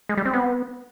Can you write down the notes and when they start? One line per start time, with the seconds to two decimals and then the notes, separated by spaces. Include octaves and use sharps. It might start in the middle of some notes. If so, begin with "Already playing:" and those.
0.09 G#3
0.17 G3
0.25 C4
0.33 B3